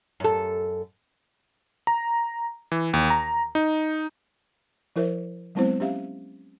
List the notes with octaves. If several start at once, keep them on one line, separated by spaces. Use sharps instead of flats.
F#2 A4
A#5
E3
D#2
A#5
D#4
F3 E4 A#4 C5 E5
F#3 G#3 B3 C4 E4 C5
C#4 G4 E5 F5